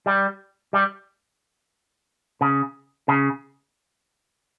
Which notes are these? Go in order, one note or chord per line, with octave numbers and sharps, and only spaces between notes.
G3
G3
C#3
C#3